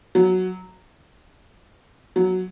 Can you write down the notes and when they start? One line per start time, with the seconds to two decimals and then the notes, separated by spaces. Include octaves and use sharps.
0.15 F#3
2.16 F#3